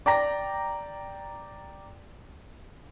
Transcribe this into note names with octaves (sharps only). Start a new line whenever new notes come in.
D5 G5 A#5 A#6